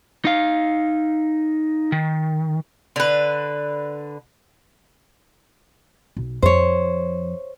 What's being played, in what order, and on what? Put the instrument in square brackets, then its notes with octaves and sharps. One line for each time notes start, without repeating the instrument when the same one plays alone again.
[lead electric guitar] D#4 F5
D#3
[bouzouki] D3 B4
[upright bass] B1
[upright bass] F2 [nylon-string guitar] C5 C#5